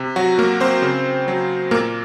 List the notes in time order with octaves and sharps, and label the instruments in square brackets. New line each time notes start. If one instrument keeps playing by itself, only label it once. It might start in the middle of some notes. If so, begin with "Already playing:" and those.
Already playing: [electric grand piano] C3
F#3 F#4
F#3 A#3 A#4
C4 C5
C#3
F#3
A#2 A#3 A#4